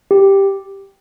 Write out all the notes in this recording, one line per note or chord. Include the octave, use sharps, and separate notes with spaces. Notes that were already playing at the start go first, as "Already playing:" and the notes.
G4